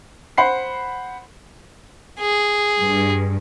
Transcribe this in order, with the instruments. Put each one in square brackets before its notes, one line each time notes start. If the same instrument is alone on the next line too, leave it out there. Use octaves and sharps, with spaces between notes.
[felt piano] C5 F#5 B5 C7
[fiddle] G#4
[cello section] G2